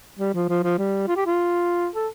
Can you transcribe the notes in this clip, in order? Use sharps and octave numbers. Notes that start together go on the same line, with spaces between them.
G3
F3
F3
F3
G3
F4
G4
F4
A4